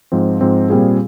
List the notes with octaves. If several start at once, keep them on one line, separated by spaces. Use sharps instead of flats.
G#2 F3 C4
G#2 F3 C4
A#2 G3 C4 F4 G#4